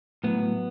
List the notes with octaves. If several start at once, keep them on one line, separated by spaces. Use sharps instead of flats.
A2 F#3 B3